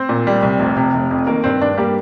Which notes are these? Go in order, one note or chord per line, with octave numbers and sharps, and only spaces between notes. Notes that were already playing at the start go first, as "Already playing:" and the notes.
Already playing: C4 C5
A#2
G3
C2
F1
C3
F1
F2
D#3 A#3 A#4
G2 C4 C5
G2 D4 D5
G3 A#3 G4